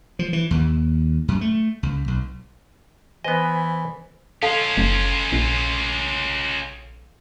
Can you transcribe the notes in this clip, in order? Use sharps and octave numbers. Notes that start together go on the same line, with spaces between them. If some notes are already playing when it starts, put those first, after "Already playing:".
F3
E3
D#2
F#2
A3
C#2
B1
E3 B3 B4 C5 D#5 G#5
C#4 F4 A4 F5 A5
F#1
A#1